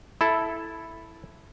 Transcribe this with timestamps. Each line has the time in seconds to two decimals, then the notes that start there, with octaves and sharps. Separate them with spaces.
0.21 E4 A4